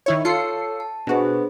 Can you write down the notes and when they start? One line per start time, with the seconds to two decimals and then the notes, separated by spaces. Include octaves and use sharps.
0.06 D#3 E4 C#5
0.25 F4 A4 C#5 A5 E6 C7 C#7
0.80 A5
1.07 B2 B3 D4 F#4 G#4 C5